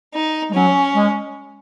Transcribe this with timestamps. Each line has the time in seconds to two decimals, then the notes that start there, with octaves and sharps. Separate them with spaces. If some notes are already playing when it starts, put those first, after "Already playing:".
0.14 D#4
0.49 G#3
0.54 F#3 C#4
0.93 G#3